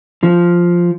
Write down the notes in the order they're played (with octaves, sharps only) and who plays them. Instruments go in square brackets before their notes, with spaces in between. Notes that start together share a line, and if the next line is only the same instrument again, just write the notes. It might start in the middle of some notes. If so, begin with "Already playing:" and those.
[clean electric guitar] F3